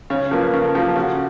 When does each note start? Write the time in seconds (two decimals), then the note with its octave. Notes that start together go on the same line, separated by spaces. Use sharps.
0.10 C#3 C#5
0.31 F3 A#3 B4
0.53 C#3 A#4
0.64 A4
0.74 F3 A#3 A4
0.85 G4
0.95 C#3 F#4